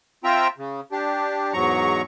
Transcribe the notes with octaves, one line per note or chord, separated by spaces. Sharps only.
C4 F4 E5 G5 A#5
C#3
D4 G4
E2 G#2 F#3 A#5 C#6